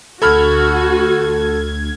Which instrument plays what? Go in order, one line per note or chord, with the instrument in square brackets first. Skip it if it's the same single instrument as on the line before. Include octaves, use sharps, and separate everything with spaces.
[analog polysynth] D2 G#6 [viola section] F#4 [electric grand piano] A4 B5 F6